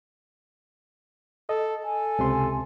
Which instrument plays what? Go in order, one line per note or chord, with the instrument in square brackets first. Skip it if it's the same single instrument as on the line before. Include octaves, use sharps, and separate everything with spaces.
[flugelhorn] A4 [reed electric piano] D#5
[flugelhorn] A4 [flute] G#5
[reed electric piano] C#2 C3 C6